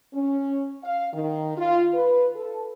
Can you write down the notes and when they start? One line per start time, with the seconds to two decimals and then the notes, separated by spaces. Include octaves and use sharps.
0.14 C#4
0.84 F5
1.13 D#3
1.57 F4
1.94 B4
2.36 A4